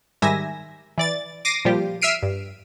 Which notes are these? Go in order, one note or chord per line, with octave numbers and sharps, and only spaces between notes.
G#2 D#3 G3 E5 G#5 A#6
E3 D5 A6
D6 A#6 C7 D#7
A#2 F3 G3 F4 G4
E5 E6 F6 C7 D7 D#7
G2